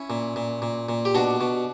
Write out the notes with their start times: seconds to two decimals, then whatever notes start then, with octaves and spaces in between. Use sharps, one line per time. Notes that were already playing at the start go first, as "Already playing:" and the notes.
Already playing: C#4 E4
0.10 A#2
0.36 A#2
0.62 A#2
0.89 A#2
1.05 G4
1.15 B2 D4 F#4
1.41 B2